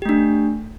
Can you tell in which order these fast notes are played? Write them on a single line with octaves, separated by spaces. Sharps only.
G4 A3 D4